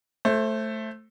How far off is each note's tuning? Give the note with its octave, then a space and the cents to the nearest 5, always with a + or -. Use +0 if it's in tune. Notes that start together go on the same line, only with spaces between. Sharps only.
A3 +0 C5 +25